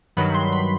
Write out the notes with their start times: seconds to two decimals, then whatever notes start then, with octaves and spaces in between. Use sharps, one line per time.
0.17 G2 D#3 F#3 B5
0.35 C6
0.53 B5